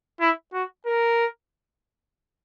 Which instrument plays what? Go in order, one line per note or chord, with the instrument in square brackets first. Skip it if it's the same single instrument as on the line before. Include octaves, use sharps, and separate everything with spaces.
[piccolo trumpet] E4
F#4
A#4